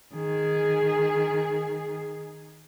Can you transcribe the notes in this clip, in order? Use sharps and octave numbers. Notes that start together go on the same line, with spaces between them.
D#3 G#4